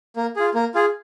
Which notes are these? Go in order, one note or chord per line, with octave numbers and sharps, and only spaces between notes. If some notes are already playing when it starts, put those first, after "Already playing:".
A#3
F4 G#4
A#3
F4 G#4